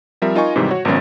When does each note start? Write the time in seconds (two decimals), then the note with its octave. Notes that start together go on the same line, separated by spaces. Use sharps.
0.22 F3 G3 C4 A#4 E5
0.35 D#4 F4 A#4 D#5 G#5 C#6
0.56 G#2 C3 D#3 E3 G3
0.71 F#4 C#5
0.85 G#1 C#2 F#2 B3 C#4